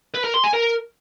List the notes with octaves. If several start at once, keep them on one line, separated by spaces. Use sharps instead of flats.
B4
A#4
C6
G#5
A#4